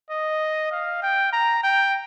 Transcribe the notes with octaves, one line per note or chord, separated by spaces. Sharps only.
D#5
F5
G5
A#5
G5